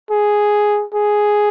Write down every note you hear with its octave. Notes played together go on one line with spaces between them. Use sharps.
G#4
G#4